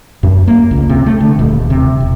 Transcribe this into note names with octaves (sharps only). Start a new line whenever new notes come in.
F#2
A#3
C#2
C3
A3
D2
D#1
C3
E1